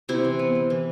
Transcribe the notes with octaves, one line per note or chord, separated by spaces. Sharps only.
C3 E4
E3
B3
B3
E3